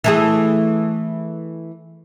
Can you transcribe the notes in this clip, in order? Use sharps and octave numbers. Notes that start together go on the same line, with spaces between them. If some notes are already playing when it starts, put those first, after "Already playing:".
E3 A3 G#4